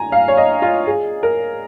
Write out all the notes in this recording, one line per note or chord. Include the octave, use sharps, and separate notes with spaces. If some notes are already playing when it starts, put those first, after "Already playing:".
Already playing: G#5 A#5
F5
C#5
D#5
F4
G#4
A#4